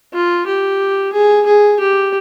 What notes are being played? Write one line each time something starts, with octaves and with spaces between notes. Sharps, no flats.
F4
G4
G#4
G#4
G4